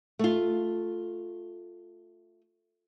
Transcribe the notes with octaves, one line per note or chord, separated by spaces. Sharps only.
A3 F4